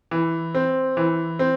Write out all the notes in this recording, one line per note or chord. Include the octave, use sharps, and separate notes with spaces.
E3
C4
E3
C4